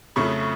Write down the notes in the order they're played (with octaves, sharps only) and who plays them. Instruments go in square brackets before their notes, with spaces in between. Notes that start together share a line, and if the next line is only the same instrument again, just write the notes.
[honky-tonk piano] F2 C#3 F#3 A3 B5 C#6